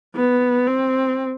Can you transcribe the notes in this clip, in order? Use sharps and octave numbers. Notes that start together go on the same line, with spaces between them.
B3
C4